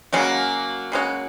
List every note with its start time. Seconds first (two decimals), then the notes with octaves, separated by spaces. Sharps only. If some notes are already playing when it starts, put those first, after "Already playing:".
0.13 C#3 F#3 G#3 A#3 C#4 F#4
0.92 C#3 G#3 C#4 F#4